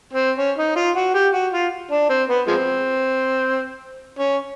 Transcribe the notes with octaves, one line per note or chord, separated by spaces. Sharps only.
C4
C#4
D#4
F4
F#4
G4
F#4
F4
D4
C4
B3
F3 G#3 C4
C#4